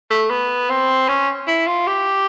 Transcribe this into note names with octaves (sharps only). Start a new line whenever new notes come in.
A3
B3
C4
C#4
E4
F4
G4